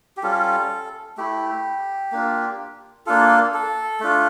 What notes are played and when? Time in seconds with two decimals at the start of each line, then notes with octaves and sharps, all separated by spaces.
0.17 G4
0.23 G3 C#4 F4 A4
1.17 A3 E4 G4
2.12 A#3 D4 F4
3.06 A#3 D4 F4 A4
3.54 A4
4.00 A3 D4 F4